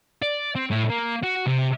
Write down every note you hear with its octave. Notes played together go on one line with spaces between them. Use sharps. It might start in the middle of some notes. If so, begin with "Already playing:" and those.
D5
C4
A2
A#3
F#4
C3